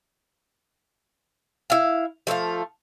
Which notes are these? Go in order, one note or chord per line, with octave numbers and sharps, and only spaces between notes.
E4 F5
F3 A3 D#5 F5